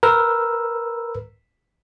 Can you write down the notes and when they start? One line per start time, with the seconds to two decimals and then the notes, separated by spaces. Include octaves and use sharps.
0.03 A#4 B4 E6